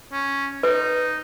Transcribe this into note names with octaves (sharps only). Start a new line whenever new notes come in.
C#4
D#4 B4